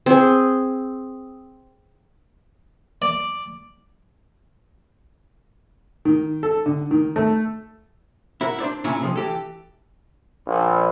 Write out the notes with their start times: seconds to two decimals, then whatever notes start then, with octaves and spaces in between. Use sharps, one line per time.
0.06 C4 G#4
3.02 D5
6.05 D#3
6.43 A4
6.66 D3
6.91 D#3
7.16 A3
8.41 E4 F#4 A#4
8.60 D4 C5 D5
8.84 A#2 C#3 C#4 D4 E4 F4
9.01 C3 F3 G#3
9.16 E3 G4 A4
10.47 A#1